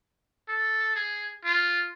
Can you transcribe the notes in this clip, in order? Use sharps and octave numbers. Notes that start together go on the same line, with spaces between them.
A4
G#4
F4